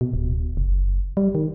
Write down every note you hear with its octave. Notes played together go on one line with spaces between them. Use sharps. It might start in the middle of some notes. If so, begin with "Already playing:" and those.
B2
D1
F#1
G3
D#3